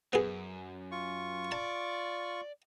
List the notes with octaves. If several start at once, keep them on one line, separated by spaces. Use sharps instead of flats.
F#2 B3 G#4
F4 C#6
D5 A5